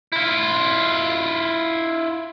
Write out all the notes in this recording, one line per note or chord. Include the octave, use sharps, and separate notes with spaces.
E4 F4